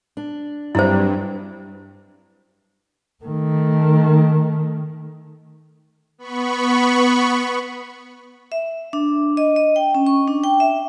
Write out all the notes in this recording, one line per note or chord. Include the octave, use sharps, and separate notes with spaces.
D4
G2 F#3 G3 C4 E4 C5
D#3 A3
B3 B5 C#6
E5
D4
D#5
D#5
G5
C#4
C#6
D4
G5
E5